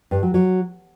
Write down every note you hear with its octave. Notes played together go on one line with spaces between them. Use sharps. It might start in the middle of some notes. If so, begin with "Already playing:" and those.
G2
F#3
F#3